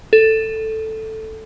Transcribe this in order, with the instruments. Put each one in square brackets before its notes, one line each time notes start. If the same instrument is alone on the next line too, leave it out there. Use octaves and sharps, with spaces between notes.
[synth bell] A4